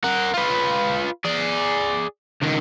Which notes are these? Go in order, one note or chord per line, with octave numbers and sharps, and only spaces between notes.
A#4 F#5
F4 B4
G#4 D5
C#2 D#3